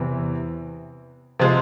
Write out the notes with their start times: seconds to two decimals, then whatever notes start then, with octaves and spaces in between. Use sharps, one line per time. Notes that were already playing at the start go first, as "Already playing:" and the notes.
Already playing: E2 C3 E3
1.39 C3 F3 G#3